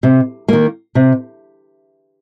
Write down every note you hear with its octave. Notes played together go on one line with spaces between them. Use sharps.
C3
D#3 A#3
C3